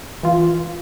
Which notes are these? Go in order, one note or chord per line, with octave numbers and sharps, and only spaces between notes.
E3 F4